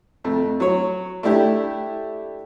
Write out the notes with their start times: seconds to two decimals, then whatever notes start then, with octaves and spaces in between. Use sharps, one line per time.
0.24 F2 A3
0.60 F#3 C#5
1.23 A3 D4 E4 G4